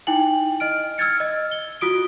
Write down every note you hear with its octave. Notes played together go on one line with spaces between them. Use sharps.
D#4 E4 G5 G#5 F#7
D#5 F6 D7
E6 F6 G#6 A6 C#7
D#5
G7
F4 F#4 D#6 D7